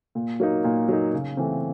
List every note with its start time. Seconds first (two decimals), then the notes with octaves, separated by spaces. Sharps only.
0.15 A#2
0.40 F#3 A#3 D#4
0.64 A#2
0.88 F#3 A#3 D#4
1.13 C#3
1.37 E3 A3 C4